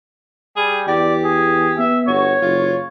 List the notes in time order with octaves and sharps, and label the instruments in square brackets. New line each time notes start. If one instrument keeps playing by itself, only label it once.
[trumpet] G3 [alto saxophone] G#4
[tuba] E2 [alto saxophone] G4 [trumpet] D5
[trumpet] G#4
[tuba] B3 [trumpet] E5
[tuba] G1 [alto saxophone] F#4 [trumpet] C#5
[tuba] F#1 [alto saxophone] F4